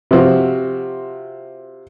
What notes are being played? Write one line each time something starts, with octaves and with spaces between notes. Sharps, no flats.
C3 F3 F#4